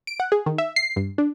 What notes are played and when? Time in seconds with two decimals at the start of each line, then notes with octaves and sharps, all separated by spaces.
0.07 D7
0.20 F#5
0.32 G#4
0.46 D#3
0.58 E5
0.76 C7
0.96 G2
1.18 D4